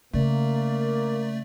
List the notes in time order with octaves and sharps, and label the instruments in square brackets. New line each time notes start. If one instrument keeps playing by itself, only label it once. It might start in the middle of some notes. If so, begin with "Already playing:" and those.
[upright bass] C#3 [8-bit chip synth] A3 D5 [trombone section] A#3